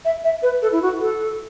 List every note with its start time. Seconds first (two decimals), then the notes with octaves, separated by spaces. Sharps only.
0.05 E5
0.24 E5
0.43 B4
0.62 A4
0.72 E4
0.82 F#4
1.01 A4